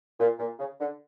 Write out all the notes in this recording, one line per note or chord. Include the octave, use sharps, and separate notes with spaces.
A#2
A#2
C#3
D3